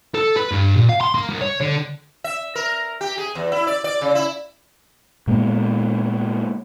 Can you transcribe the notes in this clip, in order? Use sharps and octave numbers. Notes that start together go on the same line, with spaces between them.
A4
B4
G2
A#2
F5
C6
A#3
C2
C#5
D3
E5
A#4
G4
G#4
E2
E4
D5
D5
C#3
E4
A#2 G#3 A#3 B3